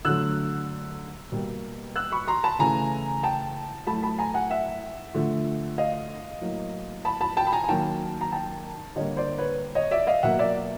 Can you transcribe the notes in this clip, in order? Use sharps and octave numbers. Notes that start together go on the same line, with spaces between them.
D3 F#3 A3 E6 F#6
B2 G3 A#3
E6 F#6
B5 C#6
A#5 C6
A5 B5
C#3 E3 A3 G#5 A#5
G5 A5
A2 F#3 A3 A5 B5
A5 B5
G#5 A#5
F#5 G#5
E5 F#5
D3 F3 A3
D#5 F5
A2 F#3 A#3
A5 B5
A5 B5
G5 A5
B5
G#5 A#5
G#5
D#3 F#3 A#3 G5 A5
A#5
G5 A5
D3 G3 A#3 C#5 D#5
C5 D5
B4 C#5
C#5 D#5
D5 E5
D#5 F5
B2 F#3 A#3 E5 F#5
D5 E5